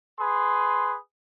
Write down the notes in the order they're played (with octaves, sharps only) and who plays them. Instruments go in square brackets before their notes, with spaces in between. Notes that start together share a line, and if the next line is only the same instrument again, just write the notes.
[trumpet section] G#4 B4 C6